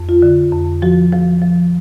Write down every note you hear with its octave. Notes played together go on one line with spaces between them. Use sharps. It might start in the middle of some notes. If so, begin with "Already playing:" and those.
Already playing: F2
F4
D3
F2
F3 F#4
F3
F3